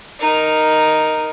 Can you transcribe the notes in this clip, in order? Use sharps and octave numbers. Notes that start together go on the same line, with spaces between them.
D#4 A#4